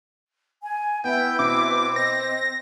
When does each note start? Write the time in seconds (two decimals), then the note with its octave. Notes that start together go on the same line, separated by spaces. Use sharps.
0.63 G#5
1.04 B3 E4 B4 G5
1.39 B2 C4 D6
1.96 C5 D#5 A#6